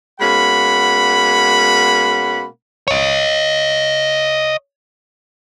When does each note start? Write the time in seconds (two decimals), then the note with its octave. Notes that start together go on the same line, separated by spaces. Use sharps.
0.20 B2 G#3 A#3 C#4 F#5 B5
2.88 C#5 D#5